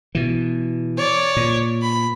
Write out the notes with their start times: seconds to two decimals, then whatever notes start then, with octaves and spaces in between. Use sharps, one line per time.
0.15 B2 E3
0.98 C#5 D5
1.37 A#2
1.82 B5